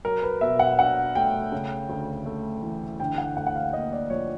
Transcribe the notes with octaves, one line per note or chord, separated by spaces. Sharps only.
F#3 A#4
B4
B2 E5
F#5
D4 F#5
A3 G5
C#3
D2
A3
E3
D3 G5
F#5
D2 F#5
F#5
F5
A#3 D#5
D5
F3 C#5